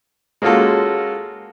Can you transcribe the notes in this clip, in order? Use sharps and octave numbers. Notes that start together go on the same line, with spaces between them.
G#3 A#3 C#4 F4 F#4 A4